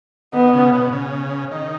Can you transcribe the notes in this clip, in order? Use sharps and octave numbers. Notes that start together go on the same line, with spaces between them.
D#3 B3
C#3
B2
C#3
D#3